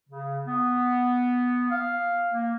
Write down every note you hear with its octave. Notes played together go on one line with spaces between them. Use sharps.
C#3
B3
F5
A#3